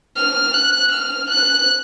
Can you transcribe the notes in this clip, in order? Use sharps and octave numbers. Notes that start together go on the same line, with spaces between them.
F6
F#6
F6
F#6